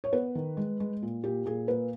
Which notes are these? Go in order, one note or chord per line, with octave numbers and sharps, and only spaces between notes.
C#5
B3 B4
D#3
G#3
G#3
A#2
A#2 G4
A#2 G#4
A#3 B4